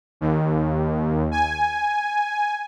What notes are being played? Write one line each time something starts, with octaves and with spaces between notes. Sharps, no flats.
D#2
G#5